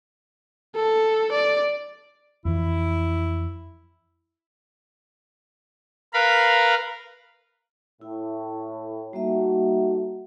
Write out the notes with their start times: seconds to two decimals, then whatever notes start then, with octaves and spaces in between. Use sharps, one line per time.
0.76 A4
1.32 D5
2.45 F2 E3 E4
6.14 A#4 B4 F5 B5
8.01 A2 E4
9.13 G3 A3 A#3 D#4 F#4 E5